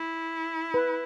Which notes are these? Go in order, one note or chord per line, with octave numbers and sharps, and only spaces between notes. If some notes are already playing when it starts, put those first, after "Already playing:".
Already playing: E4
B4